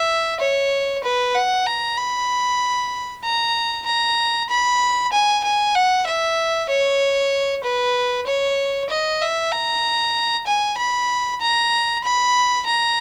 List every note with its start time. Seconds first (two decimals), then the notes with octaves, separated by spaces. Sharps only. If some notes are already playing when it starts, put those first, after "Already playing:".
Already playing: E5
0.40 C#5
1.03 B4
1.35 F#5
1.67 A#5
1.97 B5
3.24 A#5
3.86 A#5
4.50 B5
5.13 G#5
5.44 G#5
5.75 F#5
6.07 E5
6.69 C#5
7.64 B4
8.27 C#5
8.90 D#5
9.22 E5
9.52 A#5
10.47 G#5
10.78 B5
11.41 A#5
12.04 B5
12.67 A#5